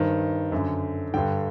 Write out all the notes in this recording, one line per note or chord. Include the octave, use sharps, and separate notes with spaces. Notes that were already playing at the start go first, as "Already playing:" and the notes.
Already playing: G2 D#3 C5
F#2 D3
G2 D3 G5